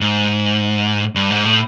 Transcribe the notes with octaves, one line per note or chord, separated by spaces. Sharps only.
G#2
G2
G#2
A2